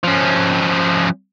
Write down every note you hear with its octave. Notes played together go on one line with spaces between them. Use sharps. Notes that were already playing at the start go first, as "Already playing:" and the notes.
F3 C#4